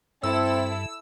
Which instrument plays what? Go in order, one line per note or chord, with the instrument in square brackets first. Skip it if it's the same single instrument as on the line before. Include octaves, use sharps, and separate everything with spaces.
[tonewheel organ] G2 [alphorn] C4 [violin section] E4 A4 [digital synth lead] E6